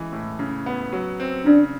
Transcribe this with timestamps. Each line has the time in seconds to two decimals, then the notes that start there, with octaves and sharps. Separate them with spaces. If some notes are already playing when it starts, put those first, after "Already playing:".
Already playing: C#3 E3 G#3
0.13 A2
0.39 C#3
0.66 B3
0.92 F#3
1.20 C4
1.46 C#3 D4